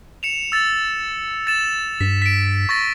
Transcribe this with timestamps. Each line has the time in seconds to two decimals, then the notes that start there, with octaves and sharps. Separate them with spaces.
0.23 C#7 E7 F7
0.52 E6 A6
1.47 A6 E7
2.01 G2 B6
2.22 B6 D7
2.69 C#6 A6 A#6